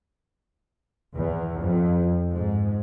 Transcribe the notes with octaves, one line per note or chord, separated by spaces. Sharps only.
E2
F2
G#2